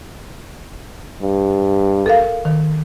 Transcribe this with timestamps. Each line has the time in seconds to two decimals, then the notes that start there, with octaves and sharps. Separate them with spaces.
1.22 G2
2.06 A4 A#4 F5
2.45 D#3